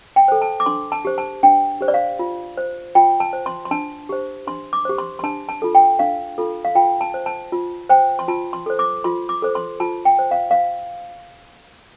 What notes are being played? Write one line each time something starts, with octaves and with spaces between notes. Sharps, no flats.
G5
A4 C5
A5
D6
D4 C6
A5
G4 C5
A5
D4 G5
G4 C5
D5
F5
F4
C5
F4 G5
A5
C5
C6
C6
D4 A5
G4 C5
D4 C6
D6
G4 C5
C6
C6
D4 A5
A5
F4 A4
G5
D4 F5
F4 A4
F5
F4 G5
A5
C5
A5
F4
C5 G5
C6
F4 A5
C6
A4 C5
D6
F4 C6
D6
A4 C5
C6
F4 A5
G5
C5
F5
F5